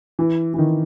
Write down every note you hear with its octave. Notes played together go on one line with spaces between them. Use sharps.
E3
E3
D#3